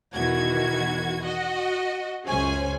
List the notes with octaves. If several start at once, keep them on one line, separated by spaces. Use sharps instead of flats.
E2 B2 D#3 E3 F#4 G#6
F#4 D#5
C#2 F#2 C#4 G#4 C5 G#5